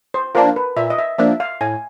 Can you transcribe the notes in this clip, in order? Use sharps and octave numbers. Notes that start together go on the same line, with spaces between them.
C5
F3 A#3 D4 A#4
B4
A#2 E5
D#5
E5
F3 A#3 D4 E5
F5
A2 G#5